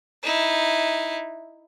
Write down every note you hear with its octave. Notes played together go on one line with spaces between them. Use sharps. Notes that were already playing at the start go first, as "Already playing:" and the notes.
D#4 E4